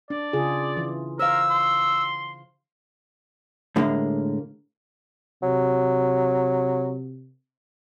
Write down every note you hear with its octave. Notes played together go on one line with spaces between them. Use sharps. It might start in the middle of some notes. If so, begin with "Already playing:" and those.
D4 D5
C#3 F4 G#4
E3
A#4 C5 F5 E6
C6
A2 D3 G#3 A#3
C3 F#3